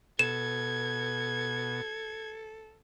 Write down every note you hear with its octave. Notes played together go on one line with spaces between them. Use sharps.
B2 A4 G#6 E7